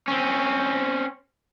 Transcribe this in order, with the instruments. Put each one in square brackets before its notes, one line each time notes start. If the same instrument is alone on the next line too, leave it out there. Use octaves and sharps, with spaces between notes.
[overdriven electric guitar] C4 C#4